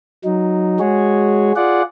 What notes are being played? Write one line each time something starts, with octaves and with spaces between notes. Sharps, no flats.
F#3 D#4
G#3 F#4 G#4 C#5
F4 G#4 D5 F#5